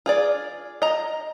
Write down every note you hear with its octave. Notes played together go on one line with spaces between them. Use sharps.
F4 G#4 D5
D#5 A#5